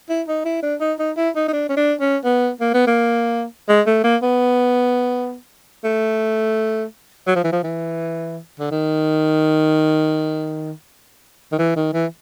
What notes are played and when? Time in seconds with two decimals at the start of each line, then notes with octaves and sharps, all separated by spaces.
0.09 E4
0.28 D#4
0.45 E4
0.62 D4
0.81 D#4
0.99 D#4
1.17 E4
1.35 D#4
1.48 D#4
1.53 D4
1.69 C#4
1.77 D4
2.01 C#4
2.24 B3
2.61 A#3
2.74 B3
2.87 A#3
3.69 G#3
3.86 A3
4.04 A#3
4.23 B3
5.84 A3
7.27 F#3
7.36 F3
7.44 E3
7.52 F3
7.63 E3
8.59 D3
8.71 D#3
11.52 D#3
11.59 E3
11.76 D#3
11.94 E3